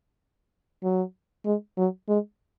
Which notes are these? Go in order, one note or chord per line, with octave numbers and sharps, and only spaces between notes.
F#3
G#3
F#3
G#3